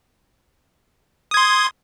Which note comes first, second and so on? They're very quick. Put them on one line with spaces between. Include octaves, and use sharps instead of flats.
D#6 G#6 C6